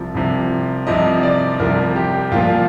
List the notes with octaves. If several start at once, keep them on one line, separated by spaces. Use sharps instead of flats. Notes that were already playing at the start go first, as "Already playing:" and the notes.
Already playing: C2 C3 F3
C2 C3 F3
C2 C3 F3 D#5
D5
C2 C3 F3 A#4
G4
C2 A#2 F3 F4